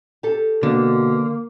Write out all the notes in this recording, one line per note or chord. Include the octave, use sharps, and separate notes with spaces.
G4 A4
B2 D3 A#3